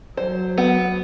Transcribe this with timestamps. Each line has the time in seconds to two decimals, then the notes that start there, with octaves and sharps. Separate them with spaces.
0.17 F#3 C5
0.58 B3